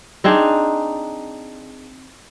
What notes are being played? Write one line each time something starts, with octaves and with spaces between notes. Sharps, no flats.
C4 D4 D#4 G#4